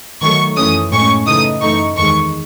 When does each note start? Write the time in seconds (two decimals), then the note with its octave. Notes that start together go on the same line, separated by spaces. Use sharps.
0.22 D#3 F#3 A3 C#6
0.57 F#2 E3 A3 C#4 D#6
0.92 A2 G#3 C#4 C#6
1.26 C#3 E3 A3 D#4 D#6
1.61 F#2 E3 A3 D#4 C#6
1.96 E2 D#3 G#3 C#6